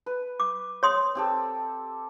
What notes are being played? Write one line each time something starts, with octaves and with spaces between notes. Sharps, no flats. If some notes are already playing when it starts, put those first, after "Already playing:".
B4
D6
C#5 C6 D#6
C4 G4 A4